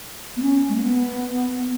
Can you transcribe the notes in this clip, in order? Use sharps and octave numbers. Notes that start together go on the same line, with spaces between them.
B3
C#4
G#3
A#3
B3